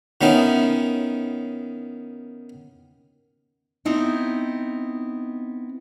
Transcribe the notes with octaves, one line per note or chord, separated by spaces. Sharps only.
D#3 B3 C#4 D#4 E4
B3 C4 D#4 E4